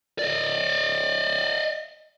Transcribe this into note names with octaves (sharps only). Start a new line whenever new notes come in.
D5 D#5